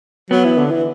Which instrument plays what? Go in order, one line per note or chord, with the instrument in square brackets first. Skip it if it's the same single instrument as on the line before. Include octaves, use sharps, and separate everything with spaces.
[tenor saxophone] F#3 [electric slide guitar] B3
[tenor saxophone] E3
D3
E3